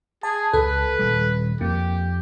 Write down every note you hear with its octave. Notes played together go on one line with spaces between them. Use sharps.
G#4 A5
C#2 A4 B4
D#1 D#2 G3
F2 A#3 G4